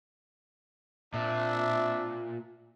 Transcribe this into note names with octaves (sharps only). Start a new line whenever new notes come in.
A#2 C4 D4 E5